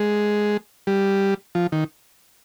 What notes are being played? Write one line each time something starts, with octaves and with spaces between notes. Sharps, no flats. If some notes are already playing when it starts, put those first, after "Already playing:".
Already playing: G#3
G3
F3
D#3